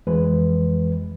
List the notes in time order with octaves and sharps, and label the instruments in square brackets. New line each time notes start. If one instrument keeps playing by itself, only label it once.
[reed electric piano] F2 E3 G#3 B4